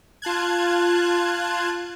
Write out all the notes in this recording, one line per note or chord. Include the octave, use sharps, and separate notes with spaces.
F4 A5 F#6 G#6